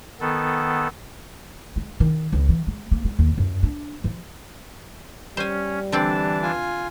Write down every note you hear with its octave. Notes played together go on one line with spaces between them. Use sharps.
D#3 B3 A4
G#3
D#3
C#2
E3
G#3
A#3
G#3
D#2
F#2
D4
F3
G3 C#4 C5 G#5
D3 E3 C4 D4 D5 A5
F4 G#5